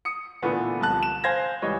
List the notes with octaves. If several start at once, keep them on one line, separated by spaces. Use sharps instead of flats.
D#6 C#7
A#2 D3 E3 A3 B3
C2 F3 A5 F#6
E7
C5 F5 G#5 G#6 A#6
C#2 E3 G3 C#5 D#5